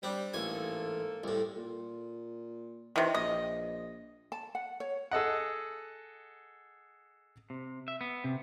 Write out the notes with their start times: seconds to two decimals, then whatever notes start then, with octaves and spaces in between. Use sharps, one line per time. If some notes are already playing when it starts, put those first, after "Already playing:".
0.03 G3 C4 D4
0.34 A1 G#2 A#3 A4 G#5
1.24 C2 A2
1.56 A#2
2.96 C3 D#3 E3
3.14 A#1 D#5
4.32 A5
4.55 F#5
4.80 C#5
5.11 G#4 A4 D#5 F#5
7.50 C3
7.88 E5
8.01 B3
8.24 C3